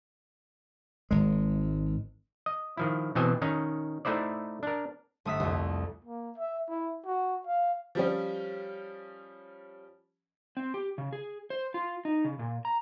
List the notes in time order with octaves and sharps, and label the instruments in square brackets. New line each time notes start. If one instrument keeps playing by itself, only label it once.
[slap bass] G#1 G#3
[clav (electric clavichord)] D#5
D#3 F3 E4
B2 E3 C4 C5 D#5 G#5
D#3 C#4 D#4
A3 D#4 E4 C5 D5
D4 A#4
[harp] G1 A3 D#6 E6 B6
C2 F2
[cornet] A#3
E5
E4
F#4
F5
[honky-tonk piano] F3 G3 C#4
[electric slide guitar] C4
G4
C#3
G#4
C5
F4
D#4
C#3
A#2
A#5